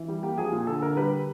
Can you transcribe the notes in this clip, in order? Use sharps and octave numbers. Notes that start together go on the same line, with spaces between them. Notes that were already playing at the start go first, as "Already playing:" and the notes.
Already playing: E3
G3
A#3 G4
F3 G#4
A#2 G#4
D3 A4
D3 A#4
G3 B4